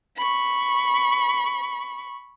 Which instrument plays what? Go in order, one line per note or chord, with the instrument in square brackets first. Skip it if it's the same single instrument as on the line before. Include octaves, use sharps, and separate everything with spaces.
[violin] B5 C#6